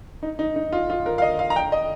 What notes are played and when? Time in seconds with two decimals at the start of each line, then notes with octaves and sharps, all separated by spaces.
0.23 D#4
0.39 D#4
0.56 D#4
0.72 F4
0.90 F4
1.06 A#4
1.18 F5
1.22 D#5
1.39 F5
1.50 A#5
1.56 G5
1.72 D#5